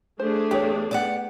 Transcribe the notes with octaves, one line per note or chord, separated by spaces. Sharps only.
A3 D4 G#4 C5
E2 G4 B4 C#5
B3 G4 D5 D#5 F#5